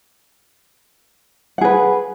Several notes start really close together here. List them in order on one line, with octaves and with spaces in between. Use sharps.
F#5 G#4 B4